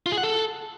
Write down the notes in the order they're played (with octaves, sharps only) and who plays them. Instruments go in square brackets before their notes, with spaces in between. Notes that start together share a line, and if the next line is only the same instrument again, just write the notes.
[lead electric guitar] F4
G#4
F#5
A4